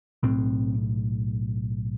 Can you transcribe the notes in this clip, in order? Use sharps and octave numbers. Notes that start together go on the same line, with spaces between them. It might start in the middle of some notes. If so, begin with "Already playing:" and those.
B1 A2 C4